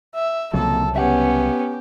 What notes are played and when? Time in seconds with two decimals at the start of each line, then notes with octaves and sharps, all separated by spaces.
0.15 E5
0.53 C2 F2 A#2 C#3 F#3 A4
0.96 B3 C#4 G4 E5 F#5